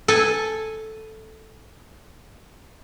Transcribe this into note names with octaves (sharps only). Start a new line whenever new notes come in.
A4 G#5